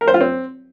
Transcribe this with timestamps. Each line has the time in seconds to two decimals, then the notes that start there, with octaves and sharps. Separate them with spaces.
0.01 A#4
0.08 C5
0.14 F4
0.21 C4